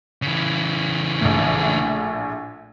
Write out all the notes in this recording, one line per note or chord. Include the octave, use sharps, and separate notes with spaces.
C#3 E3
A#1 A2